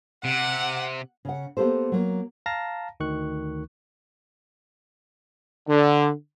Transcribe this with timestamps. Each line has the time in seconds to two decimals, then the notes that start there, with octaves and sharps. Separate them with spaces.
0.24 C3 F#5
1.25 C#3 F#5
1.57 A#3 B3 G4 A4 C5
1.92 F#3 A#3
2.46 F5 A5 A#5 A#6
3.00 D2 D#3 C#6 F#6
5.68 D3